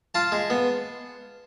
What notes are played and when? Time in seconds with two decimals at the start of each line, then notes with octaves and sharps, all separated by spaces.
0.15 F4 A5
0.32 G#3
0.50 B3